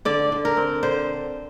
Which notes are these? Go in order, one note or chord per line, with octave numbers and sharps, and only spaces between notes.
D3 D5
D3
A#4
C4
D3 C5